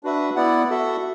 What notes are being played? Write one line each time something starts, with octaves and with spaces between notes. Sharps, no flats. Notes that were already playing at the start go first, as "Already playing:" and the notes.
D4 F#4 B4 E5
B3 E4 D5 F#5
F#4 A4 E5